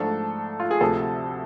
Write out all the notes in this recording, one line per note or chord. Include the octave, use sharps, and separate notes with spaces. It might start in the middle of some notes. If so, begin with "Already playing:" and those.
Already playing: G#2 F3 A3 D4 A4
F4
G#4
D2 C3 F3 A4